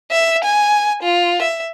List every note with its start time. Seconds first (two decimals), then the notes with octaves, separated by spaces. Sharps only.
0.11 E5
0.44 G#5
1.03 F4
1.42 E5